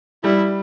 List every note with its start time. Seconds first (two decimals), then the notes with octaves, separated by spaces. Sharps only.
0.24 G3 E4